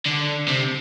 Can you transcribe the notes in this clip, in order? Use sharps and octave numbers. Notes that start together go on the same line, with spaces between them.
D3
C3